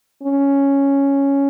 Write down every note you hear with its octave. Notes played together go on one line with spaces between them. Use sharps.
C#4